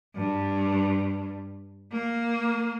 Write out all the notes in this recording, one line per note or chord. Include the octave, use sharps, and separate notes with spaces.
G2
A#3